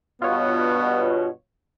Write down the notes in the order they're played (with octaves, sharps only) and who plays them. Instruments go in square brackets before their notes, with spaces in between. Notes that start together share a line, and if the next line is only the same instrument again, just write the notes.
[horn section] G2 B2 [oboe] B3 [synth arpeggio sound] F4 C#5